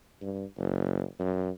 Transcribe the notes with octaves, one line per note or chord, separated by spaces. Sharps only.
G2
F#1
F#2